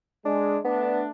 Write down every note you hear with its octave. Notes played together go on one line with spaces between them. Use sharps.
G#3 D4
A3 B3 D4